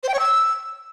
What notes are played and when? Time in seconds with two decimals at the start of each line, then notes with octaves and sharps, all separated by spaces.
0.03 C5
0.08 G5
0.14 C#5
0.19 E6